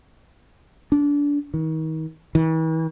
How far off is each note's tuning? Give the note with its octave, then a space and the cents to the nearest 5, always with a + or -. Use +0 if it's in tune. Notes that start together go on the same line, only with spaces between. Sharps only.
D4 -25
D#3 +35
E3 -40